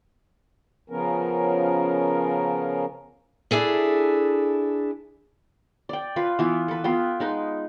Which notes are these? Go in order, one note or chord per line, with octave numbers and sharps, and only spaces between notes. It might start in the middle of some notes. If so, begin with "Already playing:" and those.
C#3 F3 B3 C#4 A#4
D4 E4 G#4 A4
D5 G5
F4 B4
E3 B3 F4
A4 B4
B3 F4 G5
G#3 D#4 B4